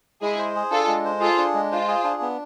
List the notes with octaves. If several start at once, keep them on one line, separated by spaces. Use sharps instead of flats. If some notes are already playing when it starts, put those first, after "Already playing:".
G#3 E4 G#4
C5
G#4
D4 F4 A4
G#3
C5
F4 G#4 A4
D4
G#3
F4 C5
G#4
D4
B3